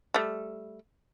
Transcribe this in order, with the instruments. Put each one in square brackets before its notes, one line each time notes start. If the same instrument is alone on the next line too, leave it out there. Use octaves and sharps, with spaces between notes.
[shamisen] G3 A3